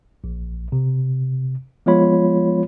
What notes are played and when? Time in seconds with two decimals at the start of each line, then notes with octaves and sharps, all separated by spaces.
0.24 A#1
0.72 C3
1.86 F3 G#3 B3 F4 C#5 B5